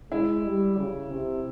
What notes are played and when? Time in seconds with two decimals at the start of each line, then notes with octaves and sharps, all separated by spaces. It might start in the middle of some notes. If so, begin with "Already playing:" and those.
0.11 G#3 E4
0.44 G3
0.78 C#3
1.11 C3